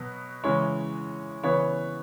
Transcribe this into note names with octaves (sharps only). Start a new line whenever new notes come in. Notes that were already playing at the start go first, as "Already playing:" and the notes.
Already playing: B2 F#3 B3
C#3 E3 G#3 C#4 C#5
C#3 E3 B3 C#5